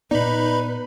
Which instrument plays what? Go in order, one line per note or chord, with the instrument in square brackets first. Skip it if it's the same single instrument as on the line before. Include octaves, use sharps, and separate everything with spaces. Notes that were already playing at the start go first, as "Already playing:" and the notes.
[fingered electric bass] A#2 B3 [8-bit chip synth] D#4 B5 [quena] B4 [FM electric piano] D5